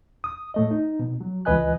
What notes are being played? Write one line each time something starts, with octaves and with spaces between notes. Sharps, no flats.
D#6
A2 A3 D#5
D#4
B2
F#3
C#2 E3 B4 D#5 G#5 F#6